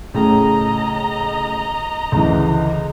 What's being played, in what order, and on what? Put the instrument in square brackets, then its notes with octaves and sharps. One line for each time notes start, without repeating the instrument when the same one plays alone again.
[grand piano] A2 C#3 [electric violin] D#5 A#5
[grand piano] C#2 D3 E3